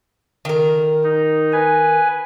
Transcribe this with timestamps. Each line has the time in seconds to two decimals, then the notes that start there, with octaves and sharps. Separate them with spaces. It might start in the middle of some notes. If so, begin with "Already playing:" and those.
0.45 D#3 A#4
1.03 D#4
1.53 B4 G#5